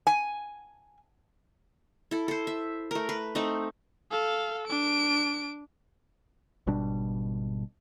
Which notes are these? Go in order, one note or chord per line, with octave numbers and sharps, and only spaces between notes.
G#5
E4 A4
A4 C5
E5
A3 A#4
B4
A3 C4 D#4
A4 F5
D4 D7
G#1 B2 G3 D4